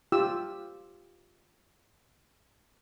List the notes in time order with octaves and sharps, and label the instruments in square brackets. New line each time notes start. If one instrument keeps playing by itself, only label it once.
[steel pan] F4 G4 E6